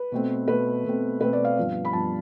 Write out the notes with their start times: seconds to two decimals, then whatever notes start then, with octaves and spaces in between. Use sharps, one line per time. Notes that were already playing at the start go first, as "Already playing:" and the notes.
Already playing: B4
0.12 B2 A3 C4
0.48 B2 A3 C4 B4
0.84 B2 A3 C4
1.21 B2 A3 C4 B4
1.33 D5
1.45 F5
1.57 G2 F3 B3
1.85 B5
1.93 G2 F3 B3 A5